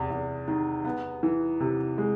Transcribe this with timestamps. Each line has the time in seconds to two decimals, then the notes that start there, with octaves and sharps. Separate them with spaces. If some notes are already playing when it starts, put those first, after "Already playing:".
Already playing: E2 C3
0.10 E2
0.48 D#3
0.85 B3
1.23 E3
1.60 C3
1.98 G#3